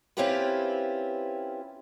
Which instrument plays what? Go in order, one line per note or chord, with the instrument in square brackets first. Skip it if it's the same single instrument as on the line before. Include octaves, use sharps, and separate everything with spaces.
[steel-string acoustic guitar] C4 C#4 E4 F4 G4 B4